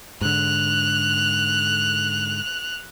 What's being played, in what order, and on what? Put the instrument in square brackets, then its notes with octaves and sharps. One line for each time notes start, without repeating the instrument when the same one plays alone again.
[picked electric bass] G#2 D3 [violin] F#6 F7